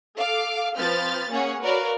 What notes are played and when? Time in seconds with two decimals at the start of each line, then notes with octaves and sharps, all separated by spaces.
0.19 A4 F5 D6
0.77 F3 C4 B4 F6 G6 A6
1.30 A#3 C#4 G#4 C#5 F#5
1.63 F#4 A#4 B4 C#5 D5 F5